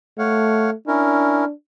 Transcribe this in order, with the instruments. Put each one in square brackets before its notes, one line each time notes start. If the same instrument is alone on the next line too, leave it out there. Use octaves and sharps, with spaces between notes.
[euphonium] A3 [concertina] C#5 F5 F#5
[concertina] C#4 E4 A#4 [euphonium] D4